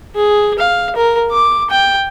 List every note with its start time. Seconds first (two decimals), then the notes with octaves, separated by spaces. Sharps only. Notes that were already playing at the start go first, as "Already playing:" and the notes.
0.16 G#4
0.59 F5
0.96 A#4
1.32 D6
1.70 G5